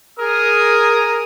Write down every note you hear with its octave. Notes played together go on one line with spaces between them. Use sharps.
G#4 A#4 D#6